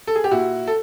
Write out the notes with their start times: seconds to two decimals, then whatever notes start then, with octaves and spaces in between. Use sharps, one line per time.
0.07 A4
0.15 G#4
0.24 G4
0.31 A#2 E4 F#4
0.67 A4